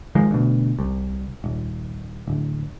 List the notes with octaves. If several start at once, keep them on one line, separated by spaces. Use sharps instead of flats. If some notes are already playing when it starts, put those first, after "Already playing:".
D#3 F3 G#3
D2 B2
C2
D#1
D1